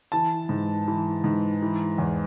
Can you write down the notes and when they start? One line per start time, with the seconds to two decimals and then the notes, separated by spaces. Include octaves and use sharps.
0.12 E3 A5
0.49 G#2
0.88 E3
1.24 G#2
1.62 E3
1.98 E2